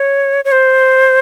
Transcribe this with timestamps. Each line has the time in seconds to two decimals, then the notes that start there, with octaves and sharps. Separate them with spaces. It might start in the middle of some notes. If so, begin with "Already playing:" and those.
Already playing: C#5
0.45 C#5
0.52 C5